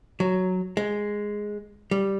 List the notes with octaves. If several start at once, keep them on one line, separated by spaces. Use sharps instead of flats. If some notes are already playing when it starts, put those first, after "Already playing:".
F#3
G#3
G3